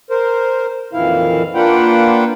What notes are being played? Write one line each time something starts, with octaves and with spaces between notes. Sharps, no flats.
A#4 C5
F2 A#2 D#3 E3 E4 F5
A#3 D4 F4 B4 F#5 G5